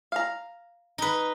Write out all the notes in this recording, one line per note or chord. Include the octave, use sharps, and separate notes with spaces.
F5 A#5
D#4 B4